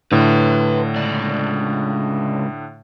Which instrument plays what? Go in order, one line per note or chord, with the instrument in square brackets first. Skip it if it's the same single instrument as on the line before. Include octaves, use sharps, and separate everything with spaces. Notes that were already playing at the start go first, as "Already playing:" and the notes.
[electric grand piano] A2 D3 [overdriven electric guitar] B4 C6
[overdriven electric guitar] C#2 D5